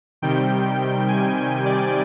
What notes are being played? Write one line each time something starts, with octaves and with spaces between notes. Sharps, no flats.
C3 D#3 G3 G5
G5
G#5
G#5
D5